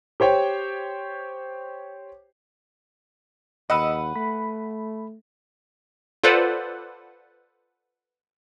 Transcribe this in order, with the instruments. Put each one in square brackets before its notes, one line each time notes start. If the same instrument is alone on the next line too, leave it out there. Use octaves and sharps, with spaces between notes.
[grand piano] G4 C5 C#5 G5
[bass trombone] D#2 [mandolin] B4 F#5 [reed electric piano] D#5 E6
[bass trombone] A3 [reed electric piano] B5
[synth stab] F4 A4 B4 C5 D5 F#5